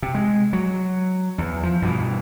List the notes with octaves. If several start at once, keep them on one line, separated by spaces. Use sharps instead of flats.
C3
G#3
F#3
E2
F3
G2 B2 E3